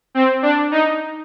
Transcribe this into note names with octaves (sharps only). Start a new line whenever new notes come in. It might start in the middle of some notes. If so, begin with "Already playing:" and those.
C4
D4
D#4